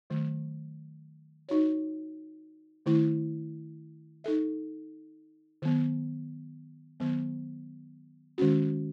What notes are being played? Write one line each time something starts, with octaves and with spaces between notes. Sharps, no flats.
D#3 F#3 A3
D#4 F#4 C#5
D#3 A3 E4
D#4 A4 E5
D#3 F#3 B3
D#3 F#3 B3
D#3 G#3 C#4 F#4